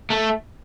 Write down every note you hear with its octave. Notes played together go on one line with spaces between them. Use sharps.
A3